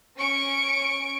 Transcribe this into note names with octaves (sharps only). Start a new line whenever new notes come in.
C#4 C#6 D7